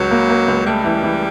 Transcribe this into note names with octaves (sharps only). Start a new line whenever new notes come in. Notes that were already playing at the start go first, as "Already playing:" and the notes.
Already playing: C#2 F#3
A#3
A#3
C#2
G3 A3
E3
E3